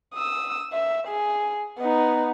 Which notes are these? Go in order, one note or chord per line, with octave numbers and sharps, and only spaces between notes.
D#6 E6
E5
G#4
B3 D#4